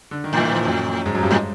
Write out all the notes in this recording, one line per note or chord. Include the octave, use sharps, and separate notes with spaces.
D3
D#3
A2 E3
F3
F#2 F#3
G#2 G#3
F#2 F#3
G2 G3
A2 G#3